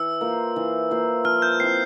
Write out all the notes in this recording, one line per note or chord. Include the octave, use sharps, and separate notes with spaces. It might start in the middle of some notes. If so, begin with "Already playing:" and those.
Already playing: E3 E6
A#3 F4 C5
E3
A#3 F4 C5
F3 F6
G6
C4 E4 C7